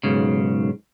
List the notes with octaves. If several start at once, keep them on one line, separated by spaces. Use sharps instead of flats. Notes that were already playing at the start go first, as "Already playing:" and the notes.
B1 G#2 C#3